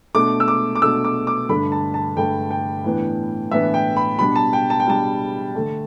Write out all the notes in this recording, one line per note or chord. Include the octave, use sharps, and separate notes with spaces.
B2 A3 D4 D6
E6
D6
D6
B2 A3 D4 E6
D6
D6
G2 D3 A3 D4 B5
A5
A5
G2 D3 A3 D4 G5
G5
A2 E3 B3 D4
A2 E3 B3 D4 E5
G5
B5
B2 G3 D4 B5
A5
G5
A5
G5
B2 G3 D4 A5
D3 A3 D4